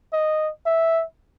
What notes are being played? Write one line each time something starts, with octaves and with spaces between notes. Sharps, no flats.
D#5
E5